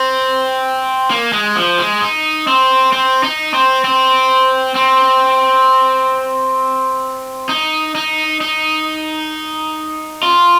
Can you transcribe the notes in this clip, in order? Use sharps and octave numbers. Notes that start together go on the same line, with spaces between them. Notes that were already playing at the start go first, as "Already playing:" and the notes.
Already playing: C4
A#3
G#3
F3
G#3
D#4
C4
C4
D#4
C4
C4
C4
D#4
D#4
D#4
F4